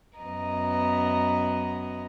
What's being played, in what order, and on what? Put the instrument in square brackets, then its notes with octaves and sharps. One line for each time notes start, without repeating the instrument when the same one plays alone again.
[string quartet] F#2 B3 D#5 A#5